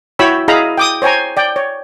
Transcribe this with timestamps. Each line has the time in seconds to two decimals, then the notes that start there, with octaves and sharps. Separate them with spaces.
0.19 E4 F#4 C#5 G5 B5 E6
0.48 E4 G#4 D#5 F5 A#5 B5
0.78 G5 D6 D#6
1.02 C5 C#5 G5 G#5 A#5
1.37 D5 G5
1.56 C#5